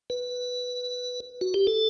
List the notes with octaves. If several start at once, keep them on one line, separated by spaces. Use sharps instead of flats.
B4
F#4
G4
A4